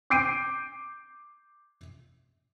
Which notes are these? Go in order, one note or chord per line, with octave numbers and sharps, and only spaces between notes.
D6 G6 C7 D7 D#7